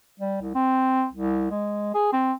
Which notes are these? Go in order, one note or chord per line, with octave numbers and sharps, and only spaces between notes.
G3
C2
C4
C2
G#3
G#4
C4